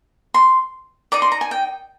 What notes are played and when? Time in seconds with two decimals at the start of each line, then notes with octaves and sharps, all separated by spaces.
0.34 C6
1.12 D#4 A#4 D5 D6
1.22 C6
1.32 A#5
1.41 G#5
1.51 G5